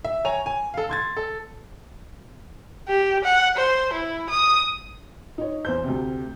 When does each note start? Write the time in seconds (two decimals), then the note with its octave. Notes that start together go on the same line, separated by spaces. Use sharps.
0.05 E5
0.25 C#5 G#5 A#5 F7
0.46 G#5
0.74 A4 F5
0.89 C6 G#6 A6
1.17 A4
2.88 G4
3.24 F#5
3.57 C5
3.93 E4
4.29 D#6
5.38 D#4 C#5
5.65 E2 C5 G6
5.84 D2 C3